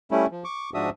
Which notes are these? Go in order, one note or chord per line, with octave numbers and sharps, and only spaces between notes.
G3 A3 C#4 E4
F3
C#6 D6
G#2 F3 D4 F#4 E5 D#6